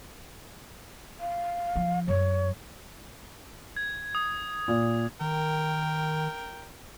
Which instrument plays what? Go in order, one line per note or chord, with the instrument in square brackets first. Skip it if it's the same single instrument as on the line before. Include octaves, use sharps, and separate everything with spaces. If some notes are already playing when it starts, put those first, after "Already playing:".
[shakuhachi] F5
[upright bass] F3
[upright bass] F#2 [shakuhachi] C#5
[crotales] G#6
D#6
[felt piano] A#2
[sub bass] D#3 [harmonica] A#4 G5